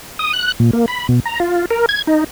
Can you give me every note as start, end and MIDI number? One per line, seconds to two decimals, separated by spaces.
0.19 0.33 87
0.33 0.52 90
0.60 0.71 46
0.73 0.86 58
0.88 1.07 83
1.08 1.20 47
1.25 1.40 82
1.40 1.65 65
1.71 1.86 70
1.89 2.02 92
2.07 2.24 63